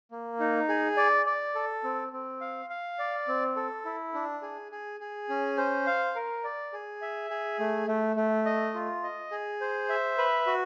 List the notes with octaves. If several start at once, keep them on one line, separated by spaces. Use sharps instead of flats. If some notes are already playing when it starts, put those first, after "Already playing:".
A#3
D#4
G#4
D5
D5
A4
C4
C4
F5
F5
D5
C4
A4
E4
D4
G#4
G#4
G#4
C#4
C5
F5
A#4
D5
G#4
E5
G#4
A3
A3
A3
D#5
F4
D#5
G#4
C5
E5
B4
F#4